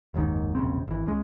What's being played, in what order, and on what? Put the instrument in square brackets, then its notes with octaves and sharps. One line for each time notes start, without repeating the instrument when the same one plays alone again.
[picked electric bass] F#1 D#2 G#2 D#3
E1 A#1 C#3 C4
G#1 E3
C#2 C#3 G#3